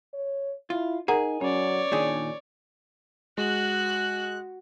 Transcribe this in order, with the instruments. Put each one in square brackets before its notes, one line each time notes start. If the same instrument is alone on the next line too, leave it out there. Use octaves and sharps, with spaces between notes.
[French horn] C#5
[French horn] E4 [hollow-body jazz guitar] F4
[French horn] D#4 [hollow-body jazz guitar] G#4 [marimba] A#4 F#5 A#5
[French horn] F#3 [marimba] C#4 [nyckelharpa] C#5 D5
[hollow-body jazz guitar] A#2 D#3 G#4 [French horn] D4
[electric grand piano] G#3 [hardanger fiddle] F#4 [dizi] F#6